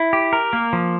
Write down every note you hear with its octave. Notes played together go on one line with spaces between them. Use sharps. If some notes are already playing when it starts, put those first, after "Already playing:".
Already playing: E4
G4
A#4
A#3
F3